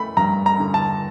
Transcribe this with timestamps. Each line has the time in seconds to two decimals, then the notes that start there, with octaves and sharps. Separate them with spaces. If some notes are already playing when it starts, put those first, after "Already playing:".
Already playing: A3 B5
0.17 G2 A#5
0.46 A#5
0.60 D3
0.74 A5